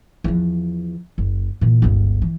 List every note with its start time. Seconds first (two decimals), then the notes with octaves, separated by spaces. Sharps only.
0.24 E2 F3
1.18 F#1
1.61 A#2 E3
1.82 G1 C#2
2.22 E3